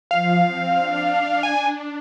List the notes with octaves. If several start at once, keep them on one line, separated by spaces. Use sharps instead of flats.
F3 F5
C4
D4
G#5